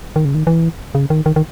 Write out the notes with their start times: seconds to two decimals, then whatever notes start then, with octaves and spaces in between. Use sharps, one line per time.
0.16 D#3
0.25 C#3
0.35 D#3
0.47 E3
0.95 C#3
1.10 D#3
1.26 D#3
1.36 D#3